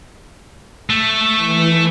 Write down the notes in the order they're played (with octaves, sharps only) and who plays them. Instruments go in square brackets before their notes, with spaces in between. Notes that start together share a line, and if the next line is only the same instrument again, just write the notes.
[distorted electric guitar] A3
[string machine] E3